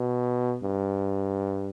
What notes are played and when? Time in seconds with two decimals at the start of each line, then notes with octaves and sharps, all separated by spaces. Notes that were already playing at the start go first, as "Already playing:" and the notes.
Already playing: B2
0.63 G2